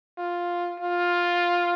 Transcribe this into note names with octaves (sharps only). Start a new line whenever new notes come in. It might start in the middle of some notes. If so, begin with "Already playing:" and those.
F4
F4